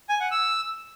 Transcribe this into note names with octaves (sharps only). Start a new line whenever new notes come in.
G#5
F#5
E6